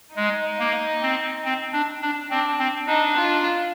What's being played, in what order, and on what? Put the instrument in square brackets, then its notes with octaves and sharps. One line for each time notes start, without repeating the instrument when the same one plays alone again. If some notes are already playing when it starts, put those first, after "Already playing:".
[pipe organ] G#3 [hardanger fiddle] D#4
[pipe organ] A#3
C4
C4
D4
D4
[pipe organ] C4 [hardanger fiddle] D4
[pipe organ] C4
[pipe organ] D4 [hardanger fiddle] D#4
[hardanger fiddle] F4